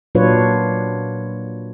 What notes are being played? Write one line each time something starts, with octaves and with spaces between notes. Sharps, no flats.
A#2 F#3 D4 F4 B4 C#5